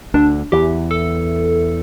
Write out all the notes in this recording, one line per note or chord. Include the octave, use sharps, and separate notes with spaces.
D2 D3 D4
E2 E3 G4
A4